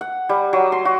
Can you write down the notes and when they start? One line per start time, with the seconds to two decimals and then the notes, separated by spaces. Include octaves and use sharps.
0.01 F#5
0.29 G3
0.53 F#3
0.72 C6
0.85 F#4